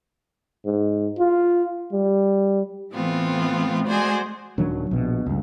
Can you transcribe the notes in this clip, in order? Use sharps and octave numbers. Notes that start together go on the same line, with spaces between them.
G#2
F4
G3
A2 E3 A3 B3 C4 F4
G#3 A3 F#4 G#4 C5 D5
D#1 D#3 F#3 D4
A#1 B2
C#2 G2